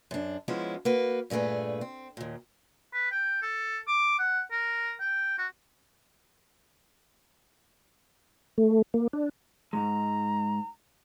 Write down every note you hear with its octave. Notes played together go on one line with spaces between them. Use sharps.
F#2 D4
F3 G#3 B3 C#4 E4
A#3 F#4 B4
G2 A#2 A3 G#4 B4
C4
D#2 A#2
B4
G5
A4
D6
F#5
A#4
G5
F#4
A3
A#3
D4
G#2 C#3 G#3 A#5